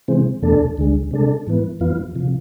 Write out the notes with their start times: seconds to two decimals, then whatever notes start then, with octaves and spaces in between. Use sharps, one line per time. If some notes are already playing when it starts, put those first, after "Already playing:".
0.08 C3 E3 G#3 C4
0.42 E2 B2 A3 D4 A4
0.78 D2 D3 G#3
1.11 C3 G#3 D4 A4
1.47 G#2 E3 B3
1.80 F2 E3 B3 F4
2.15 C3 F3